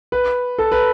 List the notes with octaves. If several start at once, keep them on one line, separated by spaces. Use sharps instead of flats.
B4
A4
B4